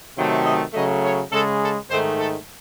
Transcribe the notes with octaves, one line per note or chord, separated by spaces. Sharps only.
C3 D#3 F#3 A3
D#5
C#3 F#3 A3 D#5
C#5
C#3 G#3 A4
A4
G#2 D#3 A3 C5
A4